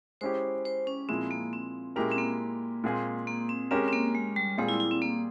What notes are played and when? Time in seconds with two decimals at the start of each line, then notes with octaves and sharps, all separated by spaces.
0.21 G#3 C#4 E4 G4 C5
0.65 C5
0.87 C#4
1.08 A#2 F3 G#3 C4 E4
1.31 A#3
1.53 C4
1.96 A#2 G#3 C#4 E4 G4 A#4
2.11 C4
2.18 A#3
2.84 A#2 G#3 C4 F4 G#4
3.27 A#3
3.49 C4
3.71 G#3 C4 C#4 G4 A#4
3.88 C4
3.92 A#3
4.15 G#3
4.36 G3
4.58 A#2 G3 G#3 C4 F4 G#4
4.69 E4
4.80 E4
4.91 C4
5.02 A#3